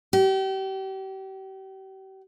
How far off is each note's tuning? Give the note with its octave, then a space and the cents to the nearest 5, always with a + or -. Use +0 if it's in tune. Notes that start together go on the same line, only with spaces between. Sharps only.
G4 -35